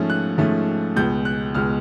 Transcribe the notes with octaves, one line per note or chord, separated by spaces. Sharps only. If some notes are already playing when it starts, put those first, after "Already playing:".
Already playing: G#2 F3 A3 C#4
F#6
G#2 F3 A3 C#4
C#2 B2 G#3 G6
F#6
C#2 B2 G#3 F6